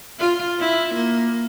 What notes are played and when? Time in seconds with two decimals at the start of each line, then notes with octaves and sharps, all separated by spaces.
0.19 F4
0.60 E4
0.95 A#3